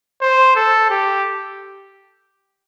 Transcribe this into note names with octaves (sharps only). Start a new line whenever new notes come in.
C5
A4
G4